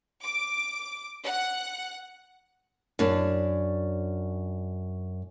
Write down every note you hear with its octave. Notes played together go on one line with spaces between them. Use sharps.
D6
F#5
F#2 D4